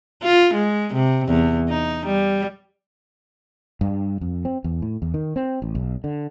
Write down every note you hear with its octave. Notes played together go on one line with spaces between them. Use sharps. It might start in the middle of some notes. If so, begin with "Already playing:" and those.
F4
G#3
C3
E2
D#4
G3
G2
F2
C4
E2
A2
E2
D#3
C4
A1
B1
D3